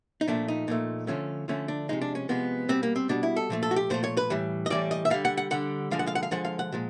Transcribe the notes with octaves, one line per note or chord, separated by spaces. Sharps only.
D#4
A#2 F3 A3 D4
D#4
A#2 F3 A3
D3 F3 A3 C#4
D3 F3 A3 C#4
D4
C3 F3 G#3 D#4
D4
C#4
C3 F3 G#3 B3
B2 G3 C4
A#3
C4
B2 G3 D4
E4
A4
A#2 F3 A3
A4
F#4
G4
A#2 F3 A3 C5
C#5
B4
A2 E3 G3
D#5
A2 E3 G3 D5
D#5
E5
D3 G3 F5
F#5
F#5
D3 G3 F#5
D3 F3 G#3 F5
F#5
F5
F#5
F5
D3 F3 G#3 F#5
F5
F#5
A#2 F3 G#3